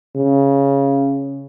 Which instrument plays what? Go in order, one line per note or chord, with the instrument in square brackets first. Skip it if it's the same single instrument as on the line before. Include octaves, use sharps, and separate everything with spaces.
[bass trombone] C#3